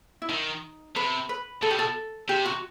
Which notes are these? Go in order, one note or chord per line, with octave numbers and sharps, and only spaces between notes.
E4
D#3 D#4
C3 B4
B4
B2 A4
G4
A4
C3 G4
F#4